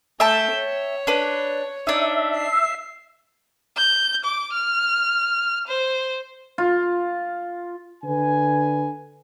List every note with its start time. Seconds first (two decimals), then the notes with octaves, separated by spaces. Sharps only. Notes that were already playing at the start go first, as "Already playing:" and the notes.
0.20 A3 E5 G5 A5 G6
0.56 C#5
1.07 D4 B4
1.87 D4 D#4 E5
2.35 C7
3.77 G6
4.25 D6
4.53 F6
5.67 C5
6.58 F4
8.04 D3 B4 G#5